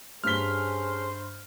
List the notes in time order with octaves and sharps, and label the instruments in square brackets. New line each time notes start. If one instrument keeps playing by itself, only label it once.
[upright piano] G2 G7 [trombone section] C#4 G#4 A4 [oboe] C5 [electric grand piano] F6 B6